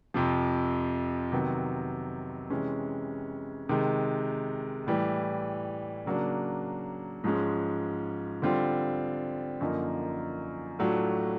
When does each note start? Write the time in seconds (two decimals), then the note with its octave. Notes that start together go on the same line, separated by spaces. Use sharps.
0.14 F2 C3 F3
1.32 C3 D#3 F#3 B3
2.50 C3 E3 G#3 C#4
3.69 C3 D#3 G#3
4.87 A2 E3 G3
6.06 C#3 F#3 A#3 D4
7.24 G#2 F3 G#3 C#4
8.42 D3 G3 C4 F4
9.61 F#2 D3 F3 A#3 D#4
10.79 A2 F#3 A3 D4 F4